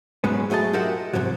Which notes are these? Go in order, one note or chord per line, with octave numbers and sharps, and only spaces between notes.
G#2 B2 F#3 G#3 B3 C#4
F#3 A3 G#4 D#5 A5
F4 G4 A#4 D#5 E5 F#5
G#2 C3 F3 F#3